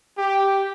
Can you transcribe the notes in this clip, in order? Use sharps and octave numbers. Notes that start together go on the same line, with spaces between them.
G4